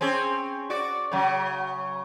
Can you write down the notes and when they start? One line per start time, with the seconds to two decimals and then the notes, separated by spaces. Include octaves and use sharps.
0.01 C4 C#4 G#4
0.70 F#4 D5
1.12 C#3 F#3